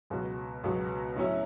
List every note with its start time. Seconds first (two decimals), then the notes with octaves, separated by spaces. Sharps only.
0.10 C#2 B2 F#3 B3 F#4
0.64 C#2 B2 F#3 B3 F#4
1.16 A2 F#3 C#4 E4